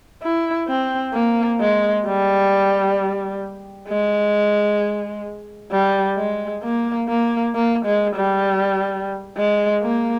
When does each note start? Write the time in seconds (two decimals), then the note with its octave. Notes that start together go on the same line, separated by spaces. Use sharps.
0.23 E4
0.68 C4
1.14 A#3
1.60 G#3
2.06 G3
3.88 G#3
5.71 G3
6.17 G#3
6.63 A#3
7.08 A#3
7.55 A#3
7.85 G#3
8.15 G3
9.38 G#3
9.82 A#3